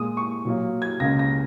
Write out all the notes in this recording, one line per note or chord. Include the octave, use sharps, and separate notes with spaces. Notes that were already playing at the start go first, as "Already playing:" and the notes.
Already playing: A#2 G#3 D#6
C#6
A#2 F#3 A#3
G#6
C#2 C#3 A#3 A#6
A#6